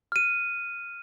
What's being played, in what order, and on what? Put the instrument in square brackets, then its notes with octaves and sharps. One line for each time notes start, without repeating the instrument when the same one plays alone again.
[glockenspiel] F6 D#7